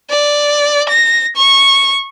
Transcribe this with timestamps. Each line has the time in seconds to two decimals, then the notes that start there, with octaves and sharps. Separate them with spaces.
0.10 D5
0.89 A#6
1.36 C#6